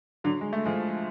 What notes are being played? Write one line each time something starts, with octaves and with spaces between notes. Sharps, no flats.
D3 F#3
G#3
A3
F3 G#3